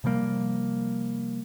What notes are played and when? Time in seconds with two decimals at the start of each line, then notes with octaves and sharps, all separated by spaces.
0.04 C3 F3 G3 A#3